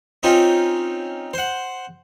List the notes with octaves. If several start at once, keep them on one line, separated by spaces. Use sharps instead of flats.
C4 C#4 D#4 F4 G4
C5 F#5